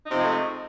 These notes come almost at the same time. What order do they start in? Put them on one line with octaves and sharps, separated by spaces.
D#4 C3 F3 G#3 A3